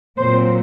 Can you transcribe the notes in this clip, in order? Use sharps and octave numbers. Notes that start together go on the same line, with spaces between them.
A#2 F#3 C4 C5